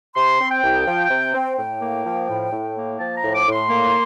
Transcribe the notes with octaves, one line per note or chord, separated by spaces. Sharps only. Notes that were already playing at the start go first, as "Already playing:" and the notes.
C3 C6
C4
G5
C2
F3
C3
C4
A2 G5
A#3
F3
A2
A2
A#3
F3 A5
A#5
A2
D6
A2
C6
A#3